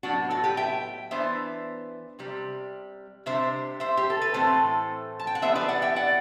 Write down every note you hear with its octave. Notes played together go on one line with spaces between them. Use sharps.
A2 F#3 B3 D4 F#4
F#4 A4
G4 B4
E5 G5
E3 B3 D4 C5 E5
C3 G3 C4
C3 G3 D4 C5 E5
C5 E5
G4
A4
B4
A2 E3 A3 C4 A4 C5
A5
G5
F#5
E3 G3 B3 D4 C5 E5
B4 D5
D5 F#5
E5 G5
D5 F#5